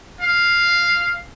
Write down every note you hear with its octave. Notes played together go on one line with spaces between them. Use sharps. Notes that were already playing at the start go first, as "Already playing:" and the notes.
F5